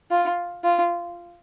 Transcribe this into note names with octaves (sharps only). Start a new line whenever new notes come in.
F4
F4